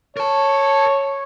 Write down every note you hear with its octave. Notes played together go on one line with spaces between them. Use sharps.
A#4 C#5 A5